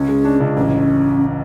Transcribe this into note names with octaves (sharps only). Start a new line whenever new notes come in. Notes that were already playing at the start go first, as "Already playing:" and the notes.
Already playing: C#2 C#4
G#3
D4
C#2
A1 C#4